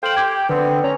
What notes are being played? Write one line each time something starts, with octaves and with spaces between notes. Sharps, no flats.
A4 C5 F5 G5 F#7
G4 G#6
D3 B3 C4 B4
C#4 A#5